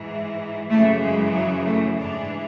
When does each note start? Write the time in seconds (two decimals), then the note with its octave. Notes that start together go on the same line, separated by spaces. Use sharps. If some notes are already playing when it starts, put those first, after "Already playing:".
Already playing: G#2 E3
0.69 F#2 C#3 E3 A3
1.01 G#3
1.33 F#3
1.65 A3
1.97 G#2 E3 D4